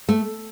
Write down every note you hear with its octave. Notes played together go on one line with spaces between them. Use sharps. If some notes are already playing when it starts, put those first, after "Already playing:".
A3